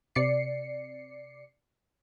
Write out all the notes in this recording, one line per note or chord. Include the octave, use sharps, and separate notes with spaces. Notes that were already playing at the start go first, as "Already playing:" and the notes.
C3 D5 C7 C#7